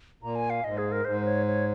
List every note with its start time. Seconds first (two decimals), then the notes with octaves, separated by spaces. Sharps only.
0.23 A#2 A#5
0.35 G#5
0.50 F5
0.64 G#2 D#5
0.78 G#4
0.92 A#4
1.05 G#2 C5
1.25 C#5
1.46 C#5